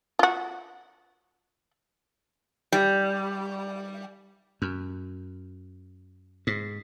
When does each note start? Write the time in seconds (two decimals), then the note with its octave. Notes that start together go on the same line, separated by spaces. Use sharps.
0.19 F4 F#4
2.72 G3
4.62 F#2
6.47 G#2